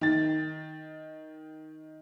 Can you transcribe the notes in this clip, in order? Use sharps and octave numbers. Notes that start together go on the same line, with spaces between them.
D#3 A6